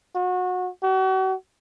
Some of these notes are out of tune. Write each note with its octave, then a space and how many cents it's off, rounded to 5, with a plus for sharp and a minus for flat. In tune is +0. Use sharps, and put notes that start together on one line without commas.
F#4 -25
F#4 +40